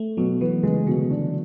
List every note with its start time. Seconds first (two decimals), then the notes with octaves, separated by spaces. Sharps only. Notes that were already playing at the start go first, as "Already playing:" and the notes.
Already playing: A3
0.17 B2 F#3
0.41 E3 B3
0.63 C#3 G#3
0.87 B2 D3
1.11 D4